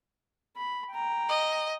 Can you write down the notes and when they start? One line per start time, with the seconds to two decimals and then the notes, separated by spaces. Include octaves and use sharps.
0.56 B5
0.91 G5 A#5
1.29 D#5